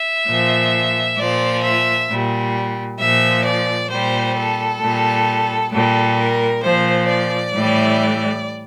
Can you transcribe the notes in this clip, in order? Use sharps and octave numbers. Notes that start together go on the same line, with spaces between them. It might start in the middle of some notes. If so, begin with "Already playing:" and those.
Already playing: E5
A#2 F3
A#2 F3 D5
E5
A#2 G3
A#2 F3 E5
D5
A#2 G3 C5
A4
A#2 G3
A#2 G3 A4
A#4
A#2 F3 C5
D5
A2 E3 G3